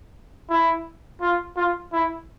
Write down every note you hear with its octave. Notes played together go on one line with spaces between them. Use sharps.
E4
F4
F4
E4